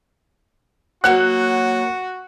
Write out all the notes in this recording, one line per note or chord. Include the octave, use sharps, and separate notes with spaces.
F#3 A#3 F#4 C#5 F#5 F#6